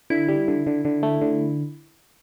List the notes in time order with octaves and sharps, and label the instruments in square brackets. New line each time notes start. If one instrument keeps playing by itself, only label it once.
[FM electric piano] D3 [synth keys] E4
[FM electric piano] G3
D3
D3
D3
A3
D3